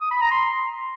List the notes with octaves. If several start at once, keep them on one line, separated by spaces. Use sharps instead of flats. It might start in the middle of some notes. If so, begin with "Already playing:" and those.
D#6
B5
A#5
C6